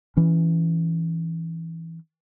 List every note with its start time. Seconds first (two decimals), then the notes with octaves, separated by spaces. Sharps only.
0.17 E3 C#4